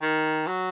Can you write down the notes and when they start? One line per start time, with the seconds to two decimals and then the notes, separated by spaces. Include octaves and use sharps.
0.02 D#3
0.47 F#3